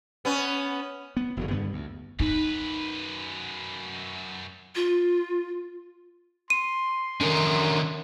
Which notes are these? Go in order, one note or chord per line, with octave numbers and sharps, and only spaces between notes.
B3 C#4
B3
F#1 D3 F#3
G2 D3 B3
D2
F#2 D#4 B4
F4
C6 D#7
D3 D#3 C#4 A#4